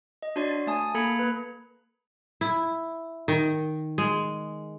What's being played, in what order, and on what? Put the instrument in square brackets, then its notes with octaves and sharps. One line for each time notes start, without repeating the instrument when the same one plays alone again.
[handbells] D#5
D4 F#4 C#5 D5 C6 C7
A6
A3 G#5 A5 D#6
A#3 A4 A#5 B5 G#6 C#7
A#3 B4
[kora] E4
D#3
G#3